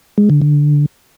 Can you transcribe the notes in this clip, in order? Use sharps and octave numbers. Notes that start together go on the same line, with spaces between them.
G#3
D3
D3